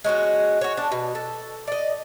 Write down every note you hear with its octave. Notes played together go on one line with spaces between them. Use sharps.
G#3 C#4 E4 F#4
F#4 C#5
D4
B2
A4
D5 D#5